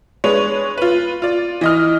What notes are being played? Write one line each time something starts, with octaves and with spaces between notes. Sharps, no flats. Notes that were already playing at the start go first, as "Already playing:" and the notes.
G#3 D4 B4 C#5
F4 B4
F4 D5
E3 D#5 F6